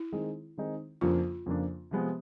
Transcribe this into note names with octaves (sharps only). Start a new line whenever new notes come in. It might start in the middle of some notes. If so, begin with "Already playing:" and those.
Already playing: E4
D#3 G#3 C4 D#4 G#4
D#3 G#3 C4 D#4 G#4
F2 C#3 F3 A#3 D4 F4
F2 C#3 F3 A#3 D4
C3 F3 G#3 B3